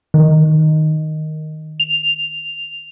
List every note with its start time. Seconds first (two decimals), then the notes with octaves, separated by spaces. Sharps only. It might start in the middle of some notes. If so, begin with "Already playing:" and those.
0.14 D#3
1.80 F7